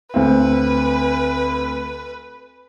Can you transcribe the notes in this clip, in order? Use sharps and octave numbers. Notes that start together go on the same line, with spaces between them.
D2 C4 B4